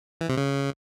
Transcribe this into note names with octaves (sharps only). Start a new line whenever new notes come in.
E3
C3
C#3